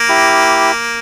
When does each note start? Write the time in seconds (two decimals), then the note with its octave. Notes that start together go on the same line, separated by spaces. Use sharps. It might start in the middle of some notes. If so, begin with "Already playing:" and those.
Already playing: A#3
0.09 E4 G4